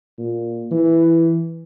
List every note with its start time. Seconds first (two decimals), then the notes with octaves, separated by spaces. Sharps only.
0.18 A#2
0.72 E3